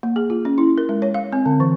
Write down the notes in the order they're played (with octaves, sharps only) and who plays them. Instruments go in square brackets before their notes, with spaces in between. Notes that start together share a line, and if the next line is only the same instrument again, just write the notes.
[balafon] A#3
G#4
F4
C#4
E4
A#4
G#3
C#5
F5
C4
D3
E3